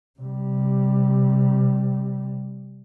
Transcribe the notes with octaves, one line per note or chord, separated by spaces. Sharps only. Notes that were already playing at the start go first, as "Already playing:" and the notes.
C3 G3